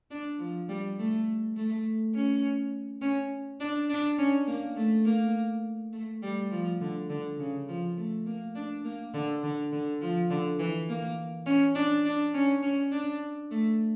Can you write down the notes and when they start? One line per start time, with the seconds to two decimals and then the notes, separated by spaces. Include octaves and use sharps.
0.10 D4
0.39 F3
0.69 G3
0.98 A3
1.56 A3
2.14 C#4
3.01 C#4
3.60 D4
3.89 D4
4.18 C#4
4.47 A#3
4.76 A3
5.05 A#3
5.93 A3
6.22 G3
6.51 F3
6.81 D3
7.10 D3
7.39 C#3
7.68 F3
7.97 A3
8.26 A#3
8.55 D4
8.84 A#3
9.14 D3
9.43 D3
9.72 D3
10.01 F3
10.30 D3
10.59 E3
10.89 A#3
11.46 C#4
11.75 D4
12.05 D4
12.34 C#4
12.62 C#4
12.92 D4
13.51 A3